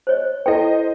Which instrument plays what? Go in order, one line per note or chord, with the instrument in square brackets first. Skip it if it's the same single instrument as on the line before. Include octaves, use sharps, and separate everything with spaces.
[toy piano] C5 C#5 D#5
[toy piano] E4 A4 G5 [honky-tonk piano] C5 D#5